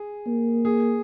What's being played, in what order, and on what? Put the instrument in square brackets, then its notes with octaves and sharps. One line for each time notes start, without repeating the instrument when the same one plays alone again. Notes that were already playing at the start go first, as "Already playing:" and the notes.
Already playing: [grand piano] G#4
[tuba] A#3
[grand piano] G#4